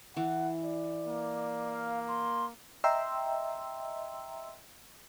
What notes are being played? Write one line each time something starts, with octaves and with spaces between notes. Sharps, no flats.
E3 F#5
D5
A#3
F5
C6
D#5 E5 G5 A#5 C6 E6